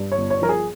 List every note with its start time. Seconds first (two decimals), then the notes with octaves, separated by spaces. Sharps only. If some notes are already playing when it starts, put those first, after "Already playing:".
Already playing: G2
0.12 C#5
0.18 G1
0.30 C#5
0.42 F3 A#4
0.49 G#4